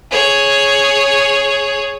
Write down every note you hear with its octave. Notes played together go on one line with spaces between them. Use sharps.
G#4 C#5